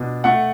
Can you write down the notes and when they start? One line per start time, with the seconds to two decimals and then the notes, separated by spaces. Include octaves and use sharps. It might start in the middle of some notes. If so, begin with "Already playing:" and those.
Already playing: B2 D4
0.24 A3 F#5